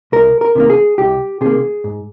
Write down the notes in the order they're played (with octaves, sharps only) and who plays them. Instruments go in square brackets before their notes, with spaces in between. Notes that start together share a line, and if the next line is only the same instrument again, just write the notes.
[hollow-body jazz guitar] C2 A#4
A#4
C3 D#3 A#3
G#4
C2 G4
C3 D#3 A#3 G#4
G#2